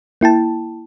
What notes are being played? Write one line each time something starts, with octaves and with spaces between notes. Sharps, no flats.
A#3 E4 G5 A5